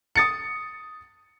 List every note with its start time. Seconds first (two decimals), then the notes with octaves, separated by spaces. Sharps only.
0.16 D#6 A6 C#7